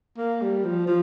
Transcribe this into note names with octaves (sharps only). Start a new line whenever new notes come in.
A#3
G3
F3
F3